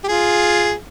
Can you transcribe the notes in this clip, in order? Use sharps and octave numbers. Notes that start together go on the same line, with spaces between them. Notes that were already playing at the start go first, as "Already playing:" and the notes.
G4
F4 G#4